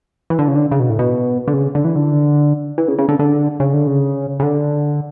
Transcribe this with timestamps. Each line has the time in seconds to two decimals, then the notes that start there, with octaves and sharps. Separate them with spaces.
0.30 E3
0.39 D3
0.48 C#3
0.56 D3
0.71 C#3
0.80 B2
0.90 A2
0.99 B2
1.48 D3
1.53 C#3
1.75 D3
1.85 E3
1.96 D3
2.78 E3
2.88 C#3
2.99 C#3
3.09 D3
3.19 D3
3.60 C#3
3.74 D3
3.87 C#3
4.40 C#3
4.43 D3